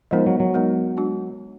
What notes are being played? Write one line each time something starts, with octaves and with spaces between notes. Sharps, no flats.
F3 G#3 B3 D#4 A#4
F#3
F#3
G#3 B3 D#4 A#4
G#3 D4 F#4